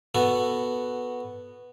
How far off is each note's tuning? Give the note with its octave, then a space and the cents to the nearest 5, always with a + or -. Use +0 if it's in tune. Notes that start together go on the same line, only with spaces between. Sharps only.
B3 +0 F#4 +0 A4 +5